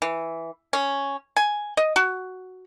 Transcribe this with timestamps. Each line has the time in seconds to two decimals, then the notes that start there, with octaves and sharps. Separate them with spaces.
0.02 E3
0.73 C#4
1.36 G#5
1.77 D#5
1.96 F#4